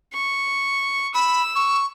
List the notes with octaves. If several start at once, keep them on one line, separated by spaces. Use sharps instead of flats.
C#6
B5 E6
C#6